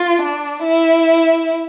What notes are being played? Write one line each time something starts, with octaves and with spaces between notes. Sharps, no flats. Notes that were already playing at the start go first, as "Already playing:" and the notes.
Already playing: F4
D4
E4